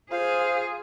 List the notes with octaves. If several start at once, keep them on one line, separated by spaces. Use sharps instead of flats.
F4 G#4 C5 F5